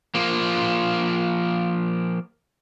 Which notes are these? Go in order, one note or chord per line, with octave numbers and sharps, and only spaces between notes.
F3 A#3